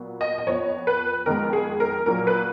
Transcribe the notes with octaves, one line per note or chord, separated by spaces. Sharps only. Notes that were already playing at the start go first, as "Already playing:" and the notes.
Already playing: A#2 F#3 B3
D#5
D#5
F2 F3 B3 C#5
B4
F2 D#3 G#3 B3 A#4
G#4
A#4
A#2 F#3 A#3 A#4
B4